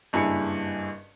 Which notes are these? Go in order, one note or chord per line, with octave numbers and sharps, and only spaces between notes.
F#1 G2 E4 G#4 B5 C#7